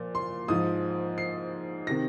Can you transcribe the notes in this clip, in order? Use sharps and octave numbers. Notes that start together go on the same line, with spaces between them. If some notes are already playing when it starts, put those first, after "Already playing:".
Already playing: A#2 F3
C6
G#2 F3 D#6
C7
C3 D#3 A#6